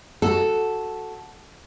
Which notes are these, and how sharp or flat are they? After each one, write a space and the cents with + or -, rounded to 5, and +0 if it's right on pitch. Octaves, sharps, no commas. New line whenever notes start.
F#4 +0 A4 -5